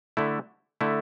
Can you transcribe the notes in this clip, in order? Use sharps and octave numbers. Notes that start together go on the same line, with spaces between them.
D3 A3 E4
D3 A3 E4